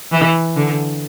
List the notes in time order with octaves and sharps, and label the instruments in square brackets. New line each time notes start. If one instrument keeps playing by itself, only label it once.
[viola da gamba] E3
D3